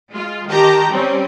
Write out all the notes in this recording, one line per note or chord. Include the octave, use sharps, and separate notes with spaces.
G#3 F4
D#3 G4 A5 A#5 G6
G3 C4 C#4